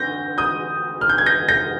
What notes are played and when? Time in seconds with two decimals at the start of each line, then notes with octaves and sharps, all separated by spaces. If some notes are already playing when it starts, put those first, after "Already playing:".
Already playing: D3 G6 A#6
0.38 D#6 G6
1.01 F6
1.09 G6
1.18 G#6
1.26 G6 A#6
1.49 G6 A#6